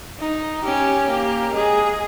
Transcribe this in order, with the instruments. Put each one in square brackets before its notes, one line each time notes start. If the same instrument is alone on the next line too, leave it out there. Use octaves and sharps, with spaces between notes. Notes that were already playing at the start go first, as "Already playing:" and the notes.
[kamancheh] D#4
[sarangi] C#4 [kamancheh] G4
[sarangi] A#3 [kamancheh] G4
[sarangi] G#3 [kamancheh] G#4